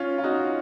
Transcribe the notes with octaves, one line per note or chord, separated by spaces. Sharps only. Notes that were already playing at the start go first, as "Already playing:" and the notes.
Already playing: C#4 F4
F4
D#4 F#4